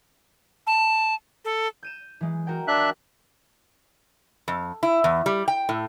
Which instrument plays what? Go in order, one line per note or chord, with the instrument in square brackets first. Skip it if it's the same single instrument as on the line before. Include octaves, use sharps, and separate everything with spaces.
[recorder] A5
A4
[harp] G6 D#7 E7
E3 G#3
F#4 A#4 G5
[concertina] D4 E5 F#6
[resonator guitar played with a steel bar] F2
E4
E2
G3
G5
A2